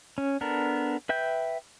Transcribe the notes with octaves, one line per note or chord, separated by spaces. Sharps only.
C#4
B3 D4 A4 A#4
B4 E5 G5 G6